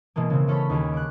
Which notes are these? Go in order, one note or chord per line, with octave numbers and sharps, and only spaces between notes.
B2 E3 G#3 A#3
C#3 C4
E3 C#4 A4 C#5 B5
D#2 C#4 G4 G#4
D6 F#6